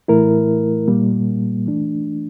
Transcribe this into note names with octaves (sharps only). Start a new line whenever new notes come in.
A2 E3 A3 E4 A#4
A#2 G3 A#3
E3 A3 D4